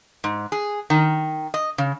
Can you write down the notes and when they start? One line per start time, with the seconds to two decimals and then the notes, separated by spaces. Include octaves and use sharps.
0.24 G#2
0.52 G#4
0.90 D#3
1.54 D#5
1.78 C#3